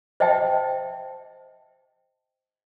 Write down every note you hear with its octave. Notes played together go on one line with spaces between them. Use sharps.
C5 D#5 E5 G5 A5